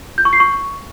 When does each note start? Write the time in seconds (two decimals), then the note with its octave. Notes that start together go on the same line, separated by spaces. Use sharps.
0.18 G6
0.25 C#6
0.33 C7
0.40 C#6